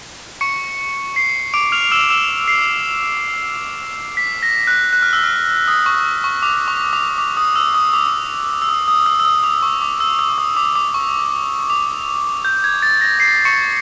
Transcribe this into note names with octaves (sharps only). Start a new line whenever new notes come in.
C#6 C#7
C7
D6 D7
F6 F7
E6 E7
E6 E7
C7
B6
A#6
F#6
F#6
F6
E6
F6
D#6
C#6
C#6
D6
C#6
D6
D6
D#6
E6
D#6
D6
E6
D#6
D#6
E6
E6
D#6
D6
C#6
D6
E6
E6
D#6
D6
D6
C#6
D6
G6
G#6
A6
A#6
C7
C#6 C#7